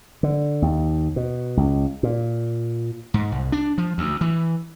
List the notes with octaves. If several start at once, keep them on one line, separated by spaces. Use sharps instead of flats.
D3
D#2
B2
C#2
A#2
G#2
C2
D4
F3
D2
E3